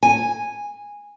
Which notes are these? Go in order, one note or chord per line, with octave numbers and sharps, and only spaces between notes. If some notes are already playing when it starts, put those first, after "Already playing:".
G#5